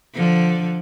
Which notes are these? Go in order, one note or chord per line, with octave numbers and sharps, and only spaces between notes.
D3 F3